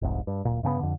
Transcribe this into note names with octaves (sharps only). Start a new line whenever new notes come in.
F1 C2 G#2
G2
D1 A#2
G2 C#3 F#3 B3
F2 D3